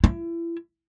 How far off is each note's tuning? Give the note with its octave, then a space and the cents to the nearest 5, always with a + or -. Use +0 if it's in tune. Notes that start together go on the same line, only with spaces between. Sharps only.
E4 +30